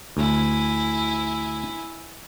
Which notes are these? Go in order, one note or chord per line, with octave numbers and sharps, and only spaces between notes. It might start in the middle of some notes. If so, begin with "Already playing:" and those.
D2 E4 G#5